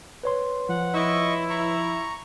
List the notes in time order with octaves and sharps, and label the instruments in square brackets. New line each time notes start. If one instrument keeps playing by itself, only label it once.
[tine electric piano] B4 C#5 C6
[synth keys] F3 [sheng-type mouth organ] F#5
[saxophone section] E4 [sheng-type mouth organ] D#5 C#6
[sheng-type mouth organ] A#5 C#6